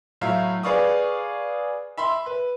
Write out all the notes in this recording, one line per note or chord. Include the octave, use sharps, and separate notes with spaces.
A2 F#3 E5 F5
G#4 B4 D5 F5 C#6 D#6
E5 B5 C6 E6
B4